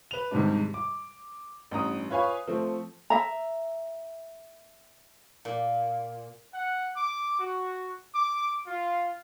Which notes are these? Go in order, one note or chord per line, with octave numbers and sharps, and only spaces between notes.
B4 F7
G#2 C3 D#3 G3 G#3 D4
D6
A1 G2 A#5 D#6
F4 B4 C#5 F5 G#5
F3 A3 C4
E5 A#5
A#2
F#5
D6
F#4
D6
F4